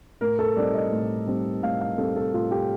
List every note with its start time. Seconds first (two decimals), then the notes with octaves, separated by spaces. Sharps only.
0.21 A2 A#4
0.39 A4
0.56 G3 C4 D#4 D5
0.75 D#5
0.92 A2
1.27 G3 C4 D#4
1.63 A2 F5
1.81 F5
1.98 G3 C4 D#4 A4
2.16 A4
2.34 A2 F4
2.51 G4